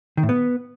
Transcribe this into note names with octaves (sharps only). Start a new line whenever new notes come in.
D#3
A2
B3